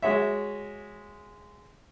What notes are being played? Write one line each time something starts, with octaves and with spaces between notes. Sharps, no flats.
G#3 F#4 C#5 E5